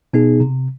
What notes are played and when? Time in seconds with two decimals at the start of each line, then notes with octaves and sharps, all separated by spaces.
0.13 B2 B3 D#4 G#4
0.40 C3